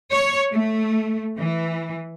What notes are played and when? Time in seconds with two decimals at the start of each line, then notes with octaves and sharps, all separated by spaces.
0.11 C#5
0.52 A3
1.39 E3